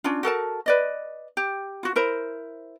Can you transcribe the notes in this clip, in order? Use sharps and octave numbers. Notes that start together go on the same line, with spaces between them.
C#4 D4 F4
F#4 A4 A#4 A5
B4 D5 D#5
G4
F4 F#4
E4 A#4 C5